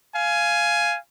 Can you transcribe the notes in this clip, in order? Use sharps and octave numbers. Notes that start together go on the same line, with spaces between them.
F5 G#5